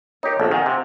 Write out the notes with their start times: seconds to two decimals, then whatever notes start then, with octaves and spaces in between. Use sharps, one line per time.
0.23 D#4 G4 A#4 C#5
0.40 A#1 A4 D#5
0.51 D#3 F5 F#5 G#5
0.66 C3